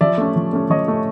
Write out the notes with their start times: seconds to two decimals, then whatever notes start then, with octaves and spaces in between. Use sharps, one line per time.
0.01 F3 D5 E5
0.18 A3 C#4
0.36 F3
0.53 A3 C#4
0.70 F3 C#5 D#5
0.88 A3 C#4